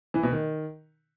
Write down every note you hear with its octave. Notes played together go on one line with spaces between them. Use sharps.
E3
B2
D#3